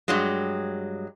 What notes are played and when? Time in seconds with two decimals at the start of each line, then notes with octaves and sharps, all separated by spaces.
0.08 G2 F#3 G#3